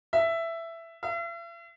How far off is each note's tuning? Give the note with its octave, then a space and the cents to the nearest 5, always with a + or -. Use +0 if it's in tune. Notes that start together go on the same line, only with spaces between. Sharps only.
E5 +10
E5 +45